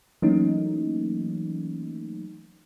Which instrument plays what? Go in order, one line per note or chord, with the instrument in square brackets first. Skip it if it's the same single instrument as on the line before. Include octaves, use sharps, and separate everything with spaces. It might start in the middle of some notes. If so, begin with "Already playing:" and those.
[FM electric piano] E3 F#3 A3 A#3 C#4 D#4